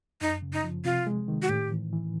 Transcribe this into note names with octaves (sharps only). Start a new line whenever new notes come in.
F#2 D#4
C#3
D#4
F3
C3 F4
G#3
D#3
F#4
A2 G4
E3
E3